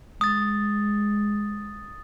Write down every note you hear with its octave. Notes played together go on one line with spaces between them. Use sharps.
G#3 D#6 A6